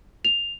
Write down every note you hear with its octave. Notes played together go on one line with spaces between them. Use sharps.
F7